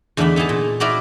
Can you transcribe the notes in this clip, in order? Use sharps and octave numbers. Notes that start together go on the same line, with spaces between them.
E2 D3 A3 D#4 E5 B5
B3 D#4 E4 G#4 A5
A#2
D#4 E4 F#4 A#4 D5 E5